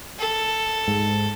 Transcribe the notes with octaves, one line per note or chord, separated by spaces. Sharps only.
A4
G#2